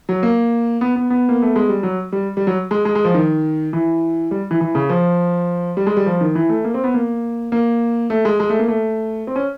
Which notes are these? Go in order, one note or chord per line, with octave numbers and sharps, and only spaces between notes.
F#3
A#3
B3
B3
B3
A#3
A3
G#3
G3
F#3
G3
G3
F#3
G#3
G#3
G#3
F3
D#3
E3
G3
E3
E3
C#3
F3
G3
G#3
G3
F3
D#3
E3
A3
A#3
C4
B3
A#3
A#3
A3
G#3
G#3
A3
A#3
A3
C4
C#4